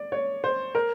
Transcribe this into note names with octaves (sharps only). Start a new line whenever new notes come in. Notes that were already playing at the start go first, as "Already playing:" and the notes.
Already playing: D5
C#5
C5
A#4